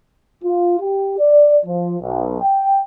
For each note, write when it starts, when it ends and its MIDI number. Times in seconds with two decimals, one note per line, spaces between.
0.44 0.76 65
0.80 1.18 67
1.19 1.58 74
1.65 1.97 53
2.01 2.39 35
2.41 2.80 79